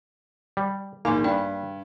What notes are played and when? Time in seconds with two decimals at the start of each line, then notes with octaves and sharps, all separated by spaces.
0.57 G3
1.05 A#1 D#3 A#3 G#5 C6 C#6
1.24 G2 D5 G5 B5